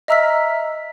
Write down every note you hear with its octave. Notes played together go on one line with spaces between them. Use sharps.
D#5 E5 A#5 E6 F6 B6